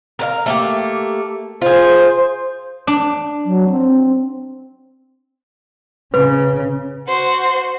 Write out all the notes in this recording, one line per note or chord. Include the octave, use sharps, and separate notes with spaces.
A#4 B4 F5
A3 A#3 G4
F4 G#4 C5
D4
F#3
C4
C#3 B4
F#4 C5